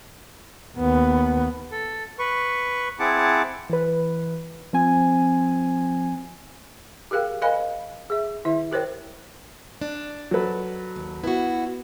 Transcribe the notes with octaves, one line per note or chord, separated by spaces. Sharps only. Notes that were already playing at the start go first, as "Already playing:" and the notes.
D#2 B3
A4
B4 C#6
C4 E4 G#4 F#5 A5 D6
E3 B4
F3 C4 G#5
G4 G#4 A#4 F5 G5
A#4 C5 D#5 F5 G#5 B5
G#4 E5
D#3 E4 E5
G4 A#4 C5 C#5 G5
D4
F#3 A4 B4
D#2
B3 E4 F#4